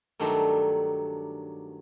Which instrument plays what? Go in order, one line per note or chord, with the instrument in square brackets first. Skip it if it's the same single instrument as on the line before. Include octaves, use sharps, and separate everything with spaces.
[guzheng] G2 D#3 F#3 A3 D4 C6